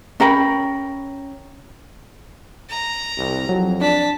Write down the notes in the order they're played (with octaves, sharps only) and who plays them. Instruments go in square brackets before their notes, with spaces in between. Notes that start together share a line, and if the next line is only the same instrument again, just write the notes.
[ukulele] C#4 A#4 G5 B5
[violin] A#5
[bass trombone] C2
[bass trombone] F2 [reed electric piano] F#3
[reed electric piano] D4 D5 [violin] A5 B6